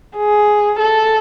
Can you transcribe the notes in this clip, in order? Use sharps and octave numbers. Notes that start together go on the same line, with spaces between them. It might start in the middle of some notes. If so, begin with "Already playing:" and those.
G#4
A4